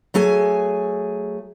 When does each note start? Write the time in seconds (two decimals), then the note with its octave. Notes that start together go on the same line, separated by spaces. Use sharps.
0.14 F#3 A3 G#4 G#5